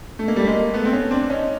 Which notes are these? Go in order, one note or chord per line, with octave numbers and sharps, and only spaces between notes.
A3
A#3
G3 A3
G#3 A#3
A3 B3
C4
B3 C#4
C4 D4
C#4 D#4